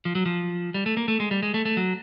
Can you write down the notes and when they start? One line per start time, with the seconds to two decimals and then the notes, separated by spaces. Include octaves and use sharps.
0.05 F3
0.15 F#3
0.26 F3
0.74 G3
0.86 A3
0.97 A#3
1.08 A3
1.20 G#3
1.31 G3
1.43 G#3
1.54 A3
1.65 A3
1.77 F#3